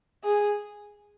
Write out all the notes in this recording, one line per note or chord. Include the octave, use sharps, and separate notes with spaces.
G#4